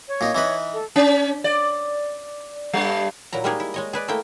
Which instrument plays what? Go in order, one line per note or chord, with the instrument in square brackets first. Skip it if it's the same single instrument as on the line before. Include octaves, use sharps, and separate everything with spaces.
[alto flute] C#5
[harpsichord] A#2 D#4
E3 D#4 B4
[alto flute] A4
[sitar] C#4
D5
G2 G3
[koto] A#2 F#3 E4 A#5
G3 G#3 A#3 D#4 G4 G#4
E4
G#3 C#5 D#5
G#4 B4 D5
A3 A#3 E4 G5